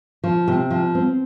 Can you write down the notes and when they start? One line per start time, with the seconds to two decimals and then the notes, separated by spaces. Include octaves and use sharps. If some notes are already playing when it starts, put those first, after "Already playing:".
0.24 F3
0.48 C3
0.70 F3
0.95 C4